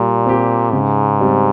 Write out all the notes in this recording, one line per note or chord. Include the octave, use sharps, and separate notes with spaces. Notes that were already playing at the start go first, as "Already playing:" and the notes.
Already playing: A#2 G3
C4 G4
G#2 C#3
G3 C4